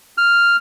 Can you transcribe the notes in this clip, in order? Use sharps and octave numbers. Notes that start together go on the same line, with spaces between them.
F6